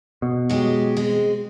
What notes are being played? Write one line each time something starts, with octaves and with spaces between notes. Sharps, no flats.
B2
F#3 G#3 G4
G#3 C4